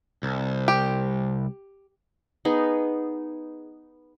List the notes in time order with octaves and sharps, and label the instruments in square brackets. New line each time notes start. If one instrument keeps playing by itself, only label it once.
[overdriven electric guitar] C2
[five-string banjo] G4
[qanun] B3 D#4 G#4